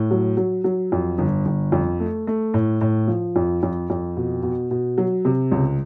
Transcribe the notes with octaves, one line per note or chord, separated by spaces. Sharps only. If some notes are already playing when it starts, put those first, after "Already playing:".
Already playing: A2
F#3
F#3
F#3
F2
G1
G1
F2
A3
A3
A2
A2
F3
F2
F2
F2
B2
B2
B2
F#3
C3
C#2